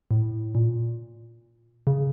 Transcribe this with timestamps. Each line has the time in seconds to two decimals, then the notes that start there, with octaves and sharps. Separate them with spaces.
0.11 A2
0.55 A#2
1.87 C#3